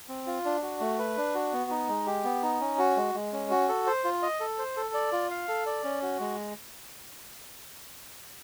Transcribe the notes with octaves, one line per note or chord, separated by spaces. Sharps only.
C4
F4
D4
F#4
A3
B4
D4
F#4
B3
D#4
G#3
G4
B3
D#4
C#4
F#4
G#3
G#3
C#4
F#4
A4
C5
F4
D#5
A4
C5
A4
D5
F4
F5
A4
D5
C#4
F#4
G#3